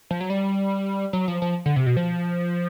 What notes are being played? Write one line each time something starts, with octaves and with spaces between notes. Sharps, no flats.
F3
F#3
G3
F#3
F3
F3
D3
C3
B2
F3